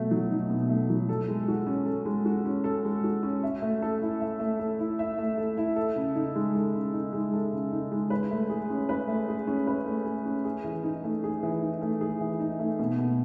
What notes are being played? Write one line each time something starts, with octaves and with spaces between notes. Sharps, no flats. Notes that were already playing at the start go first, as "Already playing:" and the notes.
Already playing: B2 F#3 A3
F#3
D#4
B2
A3
F#3
A4
G#3
F#4
C#4
A4
G#3
F#4
C#4
A4
G#3
F#4
C#4
E5
A3
A4
E4
E5
A3
A4
E4
E5
A3
A4
E4
A4
C#3
D#4
G#3
A4
C#3
D#4
G#3
A4
C#3
D#4
G#3
B4
A3
G#4
C#4
B4
A3
G#4
C#4
B4
A3
G#4
C#4
G#4
E3
D#4
A3
G#4
E3
D#4
A3
G#4
E3
D#4
A3
B2
B2